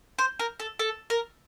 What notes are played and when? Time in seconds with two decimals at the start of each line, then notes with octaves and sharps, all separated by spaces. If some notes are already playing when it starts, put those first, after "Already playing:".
0.19 C5
0.39 A#4
0.60 A4
0.79 A4
1.10 A#4